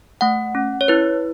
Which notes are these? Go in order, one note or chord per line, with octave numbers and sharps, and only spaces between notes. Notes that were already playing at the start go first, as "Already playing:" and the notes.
A3 F#5
C#4
C#5
E4 B4